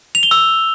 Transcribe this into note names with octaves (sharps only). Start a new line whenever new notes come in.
F7
G7
E6